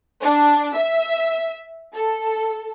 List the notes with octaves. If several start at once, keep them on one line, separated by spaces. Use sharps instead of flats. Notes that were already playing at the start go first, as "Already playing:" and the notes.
D4
E5
A4